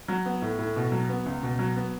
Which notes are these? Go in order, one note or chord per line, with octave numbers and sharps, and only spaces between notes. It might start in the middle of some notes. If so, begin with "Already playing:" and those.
F#3
B3
A2
A2
B2
F#3
B3
C#2
B2
F#3
B3